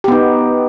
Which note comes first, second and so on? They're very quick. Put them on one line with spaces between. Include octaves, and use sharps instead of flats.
G4 B3 D#4